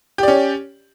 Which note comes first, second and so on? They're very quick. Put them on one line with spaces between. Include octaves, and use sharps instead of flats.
G4 D5 C#4